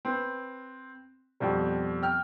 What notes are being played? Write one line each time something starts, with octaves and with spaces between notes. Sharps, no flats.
C4 B4
F2 B2 F3 G3
G5 F6